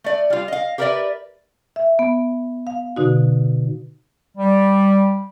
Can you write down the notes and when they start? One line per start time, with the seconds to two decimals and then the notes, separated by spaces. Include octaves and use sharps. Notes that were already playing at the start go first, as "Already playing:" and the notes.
0.04 A3 D5
0.30 G3 F4
0.48 D#5 F5
0.78 G4 A#4 B4 C#5 D5 E5
1.76 E5
1.99 B3
2.67 F5
2.96 B2 D3 D#4 F#4
4.37 G3